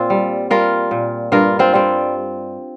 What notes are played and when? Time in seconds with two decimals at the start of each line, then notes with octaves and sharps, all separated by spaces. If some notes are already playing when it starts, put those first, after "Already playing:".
Already playing: A#2 C4 F4
0.10 G3
0.50 G3 F4 A#4
0.91 A#2
1.32 G2 F4 A#4
1.59 C4 F4
1.73 G3 C4